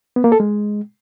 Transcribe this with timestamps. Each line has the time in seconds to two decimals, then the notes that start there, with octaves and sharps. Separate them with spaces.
0.16 B3
0.24 A#3
0.32 A4
0.40 G#3